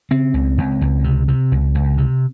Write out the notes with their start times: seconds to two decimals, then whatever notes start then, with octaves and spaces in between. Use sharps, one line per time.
0.11 C#3 C4
0.34 C#2
0.58 C#2
0.81 C#2
1.04 C3
1.28 C3
1.52 C#2
1.75 C#2
1.98 C3